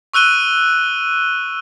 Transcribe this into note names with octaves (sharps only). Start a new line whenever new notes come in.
C#6 E6 F#6 D#7 G7